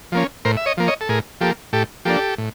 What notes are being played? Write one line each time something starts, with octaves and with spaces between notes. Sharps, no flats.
F3 A#3 C#4
A2 A#4 C5
E5
C#5 D#5
F3 A#3
C#5 D#5
A4
A2 G#4 A#4
F3 A#3 G4 A4
A2 G4 A4
F3 A#3 D4 G4 A4
A2